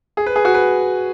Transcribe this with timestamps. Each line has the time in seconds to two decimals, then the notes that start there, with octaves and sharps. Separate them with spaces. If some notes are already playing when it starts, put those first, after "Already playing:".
0.17 G#4
0.26 B4
0.36 G#4
0.45 F#4
0.54 B4